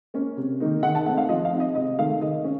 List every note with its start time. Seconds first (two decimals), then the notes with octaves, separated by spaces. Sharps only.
0.14 A#3 C#4
0.37 C3
0.60 D#3 A#3 D#4
0.83 D#3 F#5
0.95 A5
1.06 A3 C4 D#4 F#5
1.18 F5
1.29 F3 D#5
1.45 F5
1.52 C4 D#4
1.60 D#5
1.75 C3 D#5
1.98 D#3 A3 D#4 F5
2.21 D#3 D#5
2.44 C#4